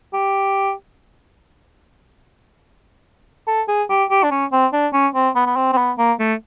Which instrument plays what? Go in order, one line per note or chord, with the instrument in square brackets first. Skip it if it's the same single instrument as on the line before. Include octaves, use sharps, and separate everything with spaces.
[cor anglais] G4
A4
G#4
G4
G4
D4
C#4
C4
D4
C#4
C4
B3
B3
C4
C4
B3
A#3
A3